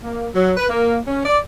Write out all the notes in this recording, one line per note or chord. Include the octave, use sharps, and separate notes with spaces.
A#3
F#3
B4
A#3
C#4
D5